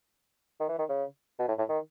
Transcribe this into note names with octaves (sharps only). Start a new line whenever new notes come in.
D#3
E3
D#3
C#3
B2
A2
A2
D#3